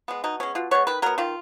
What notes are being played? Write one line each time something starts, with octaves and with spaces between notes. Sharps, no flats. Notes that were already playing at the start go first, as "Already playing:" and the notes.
G#3 B3
B2 D#4
G#3 B3 C#4
B2 F4
G#3 B3 C#5
D#3 B4
F#3 B3 A#4
D#3 F4